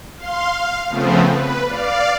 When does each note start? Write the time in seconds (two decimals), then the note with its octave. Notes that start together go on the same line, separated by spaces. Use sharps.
0.17 F5 C6
0.50 F5
0.88 C#3 F3 A3 B3 C4
1.28 B4
1.66 D5 F5